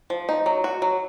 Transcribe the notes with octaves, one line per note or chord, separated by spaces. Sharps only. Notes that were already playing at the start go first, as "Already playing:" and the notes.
F3
D#4
F#3
F#4
F#3